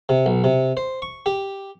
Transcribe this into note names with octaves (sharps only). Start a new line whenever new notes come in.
C3
B1
C3
C5
C#6
G4